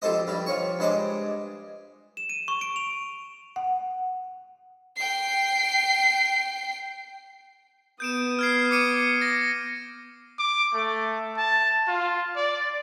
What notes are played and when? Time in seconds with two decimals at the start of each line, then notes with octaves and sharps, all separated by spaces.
0.02 A#1 G4 A4 C5 D#5
0.27 G2 G3 G4
0.46 F3 C#5 C#6
0.79 G2 G#3 C5 D#5 D6
2.17 E7
2.29 D#7
2.48 C#6
2.61 D7
2.76 F7
3.56 F#5
4.97 G5 C7
8.00 B3 D#6 G6 D7 E7
8.39 F6 G#6 C7
8.71 D6 C#7 D#7
9.22 A#6
10.39 D6
10.75 A3
11.37 A5
11.88 F4
12.36 D5